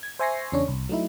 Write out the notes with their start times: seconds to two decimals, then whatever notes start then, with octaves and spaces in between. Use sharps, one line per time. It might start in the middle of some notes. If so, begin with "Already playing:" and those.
0.03 G#6
0.19 C5 E5 G#5 C#6 A#6 C7
0.52 E2 C#3 C#4 D4 C#5
0.68 C2
0.89 F#3 A3 D#4 E4